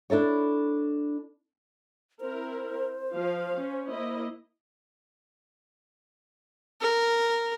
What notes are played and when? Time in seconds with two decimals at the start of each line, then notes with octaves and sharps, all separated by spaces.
0.10 D4 E4 A4 C#5
2.21 C4 E4 A#4 C5
3.12 F3 F5
3.57 C#4
3.90 A#3 E4 D#5
6.81 A#4